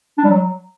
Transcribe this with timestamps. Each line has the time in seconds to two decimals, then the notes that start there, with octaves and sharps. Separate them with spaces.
0.18 D4
0.24 G3
0.30 F#3